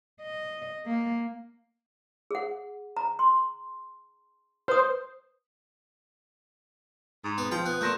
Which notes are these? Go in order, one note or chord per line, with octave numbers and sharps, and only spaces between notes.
D#5
A#3
G#4 F#5
A#5
C6
B4 C5 D#6
G#2 D#6
B3
F3 G5
B3 F#6
A#2 A3 G6 A#6 E7